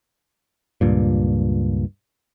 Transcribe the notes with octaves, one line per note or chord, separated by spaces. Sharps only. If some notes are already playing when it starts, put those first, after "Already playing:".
C#2 G2 A#2